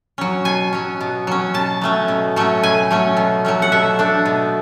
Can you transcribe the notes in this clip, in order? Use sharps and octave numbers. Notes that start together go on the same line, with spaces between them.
F#3 C#4
B2 G#5
F#3 C#4
B2
F#3 C#4
B2 A5
F#3 A3 C#4
B2
F#3 A3 C#4
B2 G#5
F#3 A3 C#4
B2
F#3 A3 C#4
F#5
B2 E5
A3 D4
B2